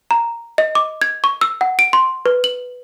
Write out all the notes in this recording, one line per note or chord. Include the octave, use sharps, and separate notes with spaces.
A#5
D#5
D6
G#6
C#6
E6
F#5
D7
C6
B4
F#7